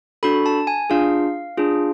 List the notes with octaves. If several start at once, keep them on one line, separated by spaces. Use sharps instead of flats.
D4 F#4 A4 B5
A5
G#5
D4 F4 G#4 F5
D4 F4 G#4